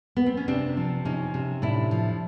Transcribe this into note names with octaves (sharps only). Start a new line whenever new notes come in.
B3
C4
C#4
C3 C4 D4
F3
C3 C#4 D#4
C3
A2 D4 E4
F3